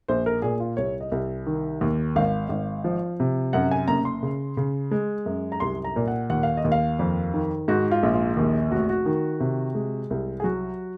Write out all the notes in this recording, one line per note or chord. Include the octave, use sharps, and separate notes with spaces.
A#1 C5
A#4
A#2 G#4
F4
C2 C#5
D#5
C2
D#3
D#2
G#1 F5
G#1
F3
C3
F#2 F#5
G#5
F#1 A#5
C6
C#3
C#3
G#3
F#2
A#5
C2 C6
A#5
A#2
F#5
D#2 F#5
F5
D#5
D#2
F5
F2
D#3
G#2 F#4
F4
A#1
F4
D#2
F1 F#4
F#4
D#3
C3
G#3
C2
G#4
F#3 F#4